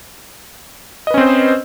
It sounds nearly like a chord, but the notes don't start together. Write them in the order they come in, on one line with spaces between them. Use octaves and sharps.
D#5 B4 C#4 C4 C5